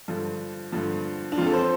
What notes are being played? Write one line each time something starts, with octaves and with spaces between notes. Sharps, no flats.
G2 D3 F3
G2 D3 F3
D4
F2 F3 F4
A4
C5